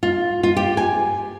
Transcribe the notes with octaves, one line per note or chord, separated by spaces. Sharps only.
F4
F4
G4
G#5